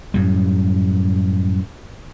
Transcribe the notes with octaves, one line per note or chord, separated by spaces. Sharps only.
F#2 A2 G3